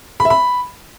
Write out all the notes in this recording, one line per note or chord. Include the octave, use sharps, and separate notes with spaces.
B5
E5
B5